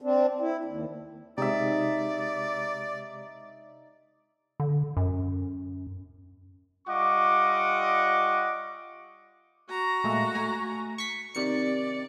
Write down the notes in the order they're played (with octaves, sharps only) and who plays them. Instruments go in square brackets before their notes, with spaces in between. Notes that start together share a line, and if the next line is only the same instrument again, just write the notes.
[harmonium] C4 D4
E4
D#2
[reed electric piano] C3 G#3 G4 [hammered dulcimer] D#4 E5 [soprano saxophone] D5
[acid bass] D3
F#2
[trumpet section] G3 F4 D#5 F#5 C#6 D6
[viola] F#4 A#5
[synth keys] A#2 G#3 A3
A3 G#5
C#6 B6
[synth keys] C3 D#3 C#7 [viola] D5